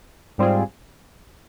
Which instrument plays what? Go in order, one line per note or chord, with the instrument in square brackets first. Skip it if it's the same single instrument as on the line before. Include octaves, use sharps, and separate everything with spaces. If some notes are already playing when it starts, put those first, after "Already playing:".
[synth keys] G#2 G3 C4 F4 G#4